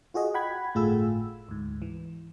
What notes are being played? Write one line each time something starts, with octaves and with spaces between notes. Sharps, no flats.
F4 F#4 G#4 D#5
F#5 G5 B5 G#6
G1 A2 A3 F4 G#4 E6
D2 G#2
E3